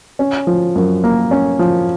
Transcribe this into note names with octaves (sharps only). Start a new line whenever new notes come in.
C#4
F3
F#2
A#3
C#4
F3